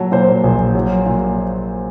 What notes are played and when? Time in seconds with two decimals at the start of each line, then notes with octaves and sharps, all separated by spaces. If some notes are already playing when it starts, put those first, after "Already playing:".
Already playing: A#2 F#3 A4
0.12 A#2 C5
0.44 A#1
0.75 F#3
1.06 A#2